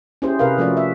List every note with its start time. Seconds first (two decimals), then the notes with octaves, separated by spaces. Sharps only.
0.22 C#4 E4 G4 G#4 C5
0.39 C3 G#4 A#4 B4 F5
0.58 F3 A3 C#4 F#4 D5
0.77 E5